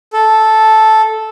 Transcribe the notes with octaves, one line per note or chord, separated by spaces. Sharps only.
A4